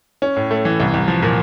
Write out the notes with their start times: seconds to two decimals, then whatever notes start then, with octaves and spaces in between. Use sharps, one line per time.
0.22 C#4
0.36 A2
0.51 A3
0.65 E3
0.80 C2
0.94 C2
1.08 F3
1.23 A#2